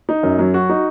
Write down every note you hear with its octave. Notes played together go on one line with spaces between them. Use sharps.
D#4
F#2
F#3
F#4
D#4